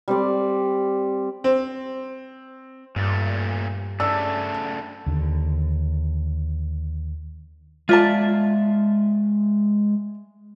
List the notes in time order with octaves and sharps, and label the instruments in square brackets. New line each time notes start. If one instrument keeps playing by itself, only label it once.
[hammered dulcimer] G3 C4 D5
[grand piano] C4
[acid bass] G2 [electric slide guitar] A#2 A3
[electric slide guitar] C#3 A3 [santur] D4 [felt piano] E6
[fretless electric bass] D#2 D3
[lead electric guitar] G#3 E5 [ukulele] F4 D5 A5